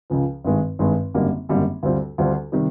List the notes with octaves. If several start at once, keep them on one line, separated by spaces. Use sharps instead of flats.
C#2 C#3 F3
G#1 G2 D#3 G#3
G#1 G2 D#3 G#3
G#1 F#2 D3 G3 A#3
G#1 F#2 D3 G3 A#3
D2 D3 G3 C4 F4
D2 D3 G3 C4 F4
C3 D#3 G3